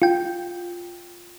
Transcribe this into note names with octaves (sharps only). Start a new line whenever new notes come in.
F4 G5